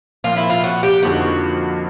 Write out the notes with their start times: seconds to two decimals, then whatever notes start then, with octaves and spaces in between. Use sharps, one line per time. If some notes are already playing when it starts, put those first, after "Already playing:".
0.24 A#2 F3 A#3 F4
0.36 E4
0.50 F4
0.64 F#4
0.83 G4
1.03 F2 D3 F3 A#3 D#4 F#4